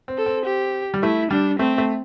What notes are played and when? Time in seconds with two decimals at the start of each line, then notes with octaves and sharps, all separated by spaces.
0.08 C4
0.18 A4
0.26 C4
0.45 G4
0.94 G3
1.03 A3 E4
1.31 G3 D4
1.59 A3 C4
1.78 A3